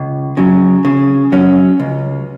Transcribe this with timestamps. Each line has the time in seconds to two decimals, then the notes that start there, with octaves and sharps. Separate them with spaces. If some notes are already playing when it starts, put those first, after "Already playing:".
Already playing: C#2
0.37 C#3 F#3
0.85 C#3
1.32 F#3 C#4
1.80 C#2